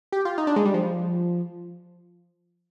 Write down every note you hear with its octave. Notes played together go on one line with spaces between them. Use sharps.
G4
F4
D#4
D4
G#3
G3
F3